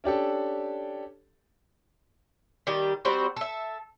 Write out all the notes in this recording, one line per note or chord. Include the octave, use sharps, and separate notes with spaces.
C#4 D4 G4 A4
D#3 G3 G4
G3 C4 F#4 C5
A4 E5